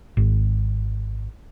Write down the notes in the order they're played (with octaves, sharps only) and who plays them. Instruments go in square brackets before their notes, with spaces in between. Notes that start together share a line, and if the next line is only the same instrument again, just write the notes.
[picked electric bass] G#1